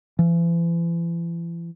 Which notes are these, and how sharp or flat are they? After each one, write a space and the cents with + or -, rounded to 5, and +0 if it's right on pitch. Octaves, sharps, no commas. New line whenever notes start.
E3 +40